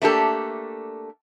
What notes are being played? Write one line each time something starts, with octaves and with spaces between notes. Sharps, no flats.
A3 A#3 D4 G4 A4